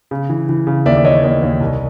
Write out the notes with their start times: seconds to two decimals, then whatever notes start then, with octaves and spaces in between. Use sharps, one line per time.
0.11 C#3
0.30 E3
0.49 E3
0.67 C#3
0.86 D#2 D5 E5
0.96 D5
1.04 E3 C#5 D#5
1.24 D#2 C#5 D#5
1.42 D#2
1.60 C2